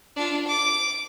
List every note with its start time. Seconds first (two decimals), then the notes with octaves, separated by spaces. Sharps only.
0.16 D4 F4
0.47 D6